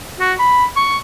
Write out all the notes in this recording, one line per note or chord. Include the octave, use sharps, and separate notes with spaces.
F#4
B5
C#6